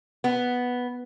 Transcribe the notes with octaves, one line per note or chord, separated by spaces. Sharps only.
B3